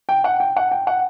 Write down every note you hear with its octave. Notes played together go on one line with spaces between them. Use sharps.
G5
F#5
G5
F#5
G5
F#5